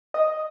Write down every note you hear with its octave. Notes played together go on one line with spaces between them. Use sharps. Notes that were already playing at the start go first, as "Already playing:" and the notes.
D#5